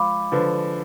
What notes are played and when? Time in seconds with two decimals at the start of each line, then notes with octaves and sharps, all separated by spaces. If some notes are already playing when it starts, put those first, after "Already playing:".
Already playing: F3 G#3 F5 B5 D6
0.32 D3 F3 B4